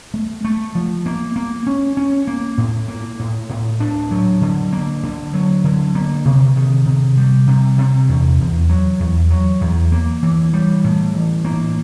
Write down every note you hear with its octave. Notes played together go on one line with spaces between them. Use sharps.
A3
A3
F3
A#3
A#3
C#4
C#4
A#3
A2
A#3
A2
A2
D4
F#3
D3
A#3
D3
F#3
D3
A#3
C3
D#3
C3
G3
C3
C3
E2
E2
F#3
E2
F#3
E2
A#3
E3
G3
A2
E3
A#3